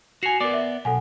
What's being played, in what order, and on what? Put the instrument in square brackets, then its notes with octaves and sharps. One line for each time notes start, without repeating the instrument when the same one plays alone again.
[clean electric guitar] F#4 G#5 [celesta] C7 C#7 F7
[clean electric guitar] B3 D5 [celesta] A#4 D6
[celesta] E5
[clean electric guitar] B1 [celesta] A4 F#5 G#5